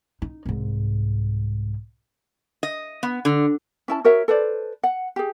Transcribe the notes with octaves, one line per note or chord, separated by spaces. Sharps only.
D#4
C2 G#2
D#5
B3
D3
C#4 E4 A5
F#4 A#4 C#5 E5
A4 B4 C5 D5
F#5
G4 G#4